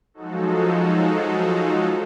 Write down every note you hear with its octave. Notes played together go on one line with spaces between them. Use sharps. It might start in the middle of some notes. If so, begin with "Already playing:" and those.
F3 F#3 G#3 D#4 F#4 A4